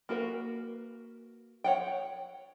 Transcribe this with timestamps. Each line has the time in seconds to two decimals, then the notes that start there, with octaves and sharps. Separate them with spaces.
0.09 A#3 F#4 A#4 B4
1.64 C#5 F#5 G5